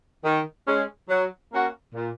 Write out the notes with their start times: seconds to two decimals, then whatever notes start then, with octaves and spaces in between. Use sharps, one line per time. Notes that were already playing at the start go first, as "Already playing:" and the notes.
0.24 D#3
0.67 G#3 C#4
1.09 F#3
1.52 A#3 C#4 F#4
1.94 A#2